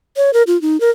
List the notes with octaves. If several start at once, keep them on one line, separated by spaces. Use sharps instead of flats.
C#5
A#4
F4
D#4
A#4